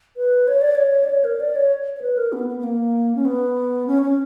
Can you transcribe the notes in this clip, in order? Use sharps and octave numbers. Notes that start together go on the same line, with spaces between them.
B4
C#5
D5
C#5
D5
C#5
A#4
D5
C#5
C#5
B4
A#4
B3
B3
B3
A#3
C#4
B3
C#4
C#4